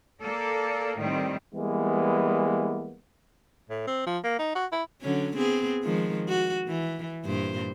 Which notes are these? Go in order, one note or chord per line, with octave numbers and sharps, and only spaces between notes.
A#3 A4 D5
A2 D#3 G3 C4
E3 G3 G#3 A#3 B3
A2
C4
F3
A#3
D#4
F#4
E4
D3 F#3 C#4
B3 C4 G#4
D#3 F3 G#3
F#4
E3
G2 A#2 C5